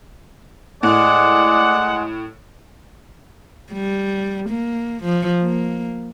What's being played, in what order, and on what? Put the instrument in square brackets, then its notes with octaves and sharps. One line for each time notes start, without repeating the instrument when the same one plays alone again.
[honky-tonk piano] A2 [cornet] G#3 [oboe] D5 [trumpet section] F#5
[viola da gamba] G3
A#3
F3
A#3